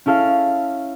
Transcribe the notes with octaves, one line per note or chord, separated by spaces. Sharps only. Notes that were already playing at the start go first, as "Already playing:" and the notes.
C#4 E4 A4 F5